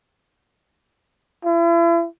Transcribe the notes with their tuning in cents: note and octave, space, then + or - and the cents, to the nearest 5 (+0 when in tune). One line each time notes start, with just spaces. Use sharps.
E4 +40